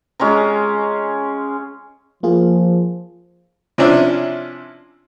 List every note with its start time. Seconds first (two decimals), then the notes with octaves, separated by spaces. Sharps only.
0.20 G#3 C#4 F4 A#5
2.23 F3 A#3 F4 G#4
3.78 C3 F3 C#4 D4 E4